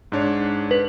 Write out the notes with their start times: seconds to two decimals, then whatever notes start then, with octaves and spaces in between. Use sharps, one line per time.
0.12 G#2 D4 C#5
0.71 B4